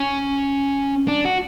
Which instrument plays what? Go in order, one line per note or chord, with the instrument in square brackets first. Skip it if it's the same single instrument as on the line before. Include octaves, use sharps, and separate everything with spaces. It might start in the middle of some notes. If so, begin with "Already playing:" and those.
Already playing: [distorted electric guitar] C#4
D4
F#4